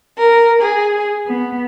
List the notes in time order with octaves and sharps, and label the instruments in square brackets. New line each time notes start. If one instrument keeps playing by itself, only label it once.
[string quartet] A#4
G#4
B3